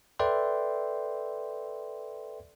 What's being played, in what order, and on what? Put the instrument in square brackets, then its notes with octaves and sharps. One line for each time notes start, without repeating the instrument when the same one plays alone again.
[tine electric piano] A4 B4 D5 E5 G5 C6